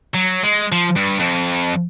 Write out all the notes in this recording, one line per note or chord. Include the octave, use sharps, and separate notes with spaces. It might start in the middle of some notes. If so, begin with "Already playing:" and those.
F#3
G#3
F3
G2
F2